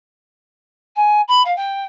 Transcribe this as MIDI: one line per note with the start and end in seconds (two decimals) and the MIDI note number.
0.96 1.21 80
1.28 1.42 83
1.45 1.55 77
1.57 1.85 79